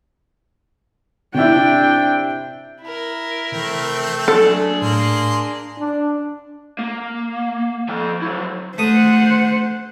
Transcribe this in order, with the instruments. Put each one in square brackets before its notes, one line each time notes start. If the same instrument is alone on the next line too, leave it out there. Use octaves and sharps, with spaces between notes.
[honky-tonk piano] C3 C4 E4 [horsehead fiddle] D4 G5
[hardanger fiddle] E4 A#4
[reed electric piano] C3 E3 [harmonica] A3 C4
[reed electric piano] F#3 A#3 A5 [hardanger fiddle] D4 G#4 [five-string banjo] A4
[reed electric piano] A2 [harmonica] A#3 C6
[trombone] D4
[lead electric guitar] A#3
F3 G5
F#3 E4
[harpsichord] A3 D#6 [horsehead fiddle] C5 F#5